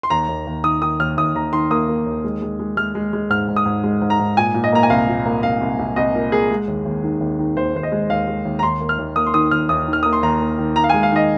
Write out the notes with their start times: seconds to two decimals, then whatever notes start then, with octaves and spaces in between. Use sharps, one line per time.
0.03 C6
0.10 D#2 A#5
0.29 D#2
0.47 D#2
0.64 D#3 D#6
0.82 D#3 D#6
1.00 D#2 F6
1.17 D#2 D#6
1.35 D#2 A#5
1.53 D#3 C6
1.71 A#3 D#6
1.88 A#3
2.06 D#2
2.24 G#3
2.42 G#3
2.59 G#3
2.77 G#3 F6
2.95 G#3
3.13 G#3
3.30 G#2 F6
3.48 G#2
3.56 D#6
3.65 G#2
3.84 G#3
4.02 G#2
4.10 A#5
4.19 G#2
4.37 A#2 G#5
4.54 A#2
4.64 D#5
4.72 A#3 A#5
4.83 G#5
4.90 C2 F5
5.08 A#2
5.26 A#3
5.43 C2 F5
5.61 C2
5.79 C2
5.96 C2 D#5
6.14 A#2 A#4
6.32 A#3 G#4
6.50 G#3
6.68 D#2
6.85 D#2
7.03 D#3
7.21 D#2
7.39 D#3
7.57 D#2 C5
7.74 D#2 C5
7.83 D#5
7.92 G#3
8.10 D#2 F5
8.27 G#3
8.45 D#2
8.59 A#5
8.63 D#2 C6
8.81 A#3
8.89 F6
8.98 D#2
9.16 A#3 D#6
9.26 C6
9.34 D#3 D#6
9.51 D#2 F6
9.69 D#2 D#6
9.87 D#3
9.93 F6
10.03 A#3 D#6
10.13 C6
10.23 D#2 A#5
10.40 A#3
10.58 D#3
10.75 D#3 A#5
10.84 F5
10.89 G#5
10.94 G#3
11.03 F5
11.12 D#3 D#5